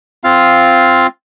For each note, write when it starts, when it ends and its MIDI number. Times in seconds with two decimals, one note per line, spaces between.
0.24 1.07 60
0.24 1.07 65
0.24 1.07 77